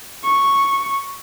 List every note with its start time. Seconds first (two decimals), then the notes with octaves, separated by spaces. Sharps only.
0.25 C#6